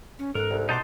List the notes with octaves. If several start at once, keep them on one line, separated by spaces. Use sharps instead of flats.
C#4
G#2 A4 A#4 F#6
C2
B2 D#4 F#5 A5 C6 D6